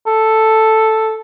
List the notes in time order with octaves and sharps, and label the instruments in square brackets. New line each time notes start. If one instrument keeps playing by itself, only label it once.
[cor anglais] A4